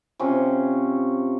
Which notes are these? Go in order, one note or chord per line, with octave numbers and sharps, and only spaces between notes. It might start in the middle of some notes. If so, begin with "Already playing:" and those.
C3 F3 C#4